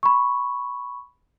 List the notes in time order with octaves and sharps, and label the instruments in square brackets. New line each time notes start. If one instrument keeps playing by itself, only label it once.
[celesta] B5 C#6